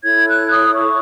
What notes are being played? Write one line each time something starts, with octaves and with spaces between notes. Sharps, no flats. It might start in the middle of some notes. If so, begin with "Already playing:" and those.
E4 A4 C#5 G#6
F#6
D#6
C#6